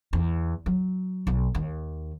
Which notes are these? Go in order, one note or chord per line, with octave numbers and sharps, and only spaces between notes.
E2
F#3
B1
D#2